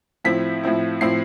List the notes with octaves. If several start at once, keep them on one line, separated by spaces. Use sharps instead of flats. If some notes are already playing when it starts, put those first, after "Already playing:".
A2 F3 C4 E4 B6
A2 F3 C4 E4
A2 F3 C4 E4 C7